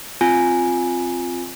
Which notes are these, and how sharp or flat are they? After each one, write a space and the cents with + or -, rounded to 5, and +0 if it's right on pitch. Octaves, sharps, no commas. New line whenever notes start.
C4 +0 F4 +0 G#5 +0